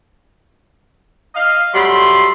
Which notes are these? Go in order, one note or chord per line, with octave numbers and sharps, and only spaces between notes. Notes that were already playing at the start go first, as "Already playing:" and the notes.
D#5 F5
F#3 G3 A3 B5 C6